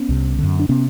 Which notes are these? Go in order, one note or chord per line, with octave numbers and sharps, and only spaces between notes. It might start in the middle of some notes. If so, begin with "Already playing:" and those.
Already playing: B3 C#4
C2 C3
F#2 D3
D4
C3 B3 C#4